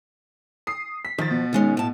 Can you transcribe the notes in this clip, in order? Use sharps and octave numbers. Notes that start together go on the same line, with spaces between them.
D#6 C7
B6
D#3 F3 A6
B2
D#3 G#3 C#4
A2 A5